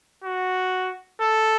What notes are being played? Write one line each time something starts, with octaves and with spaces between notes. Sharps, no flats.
F#4
A4